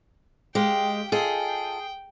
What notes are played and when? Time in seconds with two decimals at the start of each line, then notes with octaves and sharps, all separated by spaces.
0.55 G#3 G4 F5 G5
1.12 F4 G#4 A4 D#5 G5